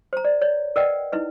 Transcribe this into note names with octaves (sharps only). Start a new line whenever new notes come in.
C5 A#5
D5
C#5 D5
A#4 B4 D5 D#5 F#5 G5
D#4 E4 B4 D#5